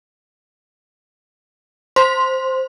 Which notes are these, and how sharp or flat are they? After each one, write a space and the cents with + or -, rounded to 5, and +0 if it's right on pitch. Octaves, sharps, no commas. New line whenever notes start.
C5 +0 C6 +0